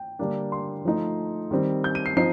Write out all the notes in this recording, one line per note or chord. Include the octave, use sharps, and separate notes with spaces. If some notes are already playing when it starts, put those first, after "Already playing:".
Already playing: G5
D3 G3 A#3 D4
C6
F3 A3 D#4
D#3 G3 C4
G6
D#7
C7
F3 C4 D#4 C7